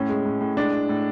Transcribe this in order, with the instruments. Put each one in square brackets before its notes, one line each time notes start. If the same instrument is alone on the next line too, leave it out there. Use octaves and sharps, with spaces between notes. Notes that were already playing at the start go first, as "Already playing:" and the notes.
Already playing: [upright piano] A2 [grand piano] C#4
[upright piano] G#3
A2
A2
[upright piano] G#3 [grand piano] D4
[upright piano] A2
A2